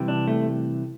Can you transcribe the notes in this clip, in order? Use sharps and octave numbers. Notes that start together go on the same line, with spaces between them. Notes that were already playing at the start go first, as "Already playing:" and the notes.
Already playing: C3 E3 G3
D4
A3